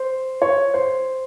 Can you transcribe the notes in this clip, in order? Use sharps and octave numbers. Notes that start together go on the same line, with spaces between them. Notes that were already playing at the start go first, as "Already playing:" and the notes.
Already playing: C5
C#5
C5